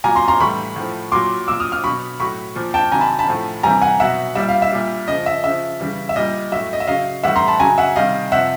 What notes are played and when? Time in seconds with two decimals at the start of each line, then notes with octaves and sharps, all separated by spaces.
0.04 A#2 F#3 G#5 A#5
0.16 A#5 C6
0.28 A#5 C6
0.40 A2 E3 G3 B5 C#6
0.76 A2 F3
1.12 A#2 F#3 C6 D6
1.48 A#2 F#3 D6 E6
1.60 D#6 F6
1.72 D#6 F6
1.84 B2 F#3 B5 C#6
2.20 A2 F#3 B5 C#6
2.56 A#2 F3
2.74 G5 A5
2.92 C3 D#3 F#3 G#5 A#5
3.01 A5 B5
3.19 A5 B5
3.28 A2 F3
3.63 C3 E3 G3 G#5 A#5
3.81 F#5 G#5
4.00 B2 F#3 E5 F#5
4.35 A#2 G3 E5
4.49 F5
4.62 E5
4.72 A#2 G3
5.08 C#3 F3 D#5
5.26 E5
5.44 C#3 F3 E5
5.80 C#3 E3 G3
6.09 E5
6.16 A#2 G3 D#5
6.52 A2 F#3 E5
6.73 D#5
6.80 E5
6.87 C#3 F#3 D#5 F5
7.23 A2 E3 G3 E5 F#5
7.36 A#5 C6
7.48 A5 B5
7.59 C#3 F#3 G#5 A#5
7.78 E5 F#5
7.96 C3 D#3 G3 D#5 F5
8.32 C3 F3 E5 F#5